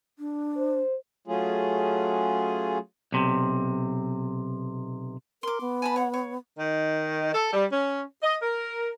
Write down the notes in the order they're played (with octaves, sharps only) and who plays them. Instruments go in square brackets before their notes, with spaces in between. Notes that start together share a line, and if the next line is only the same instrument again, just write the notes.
[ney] D4
[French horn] C5
[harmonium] F#3 A3 C#4 F4 G#4
[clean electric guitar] B1 C3
[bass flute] A#4 [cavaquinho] C6 D6
[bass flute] B3
[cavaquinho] G#5 A5 B5
C#5 F#5
C#5
[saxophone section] D#3
A4
G3
C#4
D#5
A#4